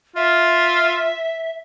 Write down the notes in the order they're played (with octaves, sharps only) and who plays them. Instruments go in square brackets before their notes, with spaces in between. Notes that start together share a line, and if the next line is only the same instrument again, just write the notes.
[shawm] F4 [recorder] E5